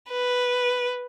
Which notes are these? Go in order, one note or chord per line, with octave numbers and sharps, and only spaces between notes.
B4